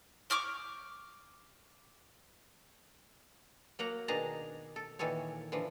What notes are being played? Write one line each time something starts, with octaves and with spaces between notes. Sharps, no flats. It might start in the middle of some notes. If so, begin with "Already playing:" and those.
C#6 D6 F6 G6
F#3 A#3 F#5 A#5
B2 D#3 D4 G#4 A5 A#5
A4
A#2 D#3 E3 A4 C#5
D3 E3 F3